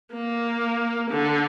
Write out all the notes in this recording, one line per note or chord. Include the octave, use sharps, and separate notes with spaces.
A#3
D3